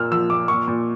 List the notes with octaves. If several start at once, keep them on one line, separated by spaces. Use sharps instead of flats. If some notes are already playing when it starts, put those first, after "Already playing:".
Already playing: A#2 A#3 E6 F6
F3 E6
A#2 D6
A#2 C#6
A#2